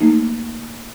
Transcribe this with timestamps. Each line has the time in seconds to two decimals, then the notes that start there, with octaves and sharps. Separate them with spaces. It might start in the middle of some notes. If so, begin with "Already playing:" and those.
0.01 A3 A#3 D#4